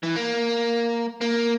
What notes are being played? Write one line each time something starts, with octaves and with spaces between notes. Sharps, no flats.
E3
A#3
A#3